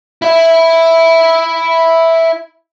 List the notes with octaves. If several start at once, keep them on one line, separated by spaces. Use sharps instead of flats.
E4 E5